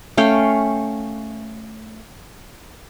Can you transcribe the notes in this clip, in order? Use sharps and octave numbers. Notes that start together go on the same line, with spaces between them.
A3 C#4 F5 G5